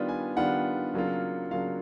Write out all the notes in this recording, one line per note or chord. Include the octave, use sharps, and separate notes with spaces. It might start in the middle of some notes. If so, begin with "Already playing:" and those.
Already playing: D#3 G3 B3 D4 F4
G#5
D#3 G3 B3 D4 F4 F#5
C#3 F#3 A#3 D4 F4
C#3 F#3 A#3 D4 F4 F5